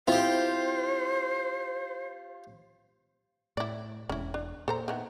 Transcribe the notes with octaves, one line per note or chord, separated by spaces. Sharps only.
C4 E4 F4 G4 C5
A2 E4 D5
E1 C#4 E4
D4
A#2 A4 C5 A#5
D#3 E3 B3